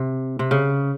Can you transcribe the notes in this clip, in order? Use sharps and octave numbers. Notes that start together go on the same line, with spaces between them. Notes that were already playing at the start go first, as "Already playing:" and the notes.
Already playing: C3
C3
C#3